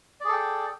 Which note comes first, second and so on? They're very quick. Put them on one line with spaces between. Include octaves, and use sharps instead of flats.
D5 G#4 A4 G5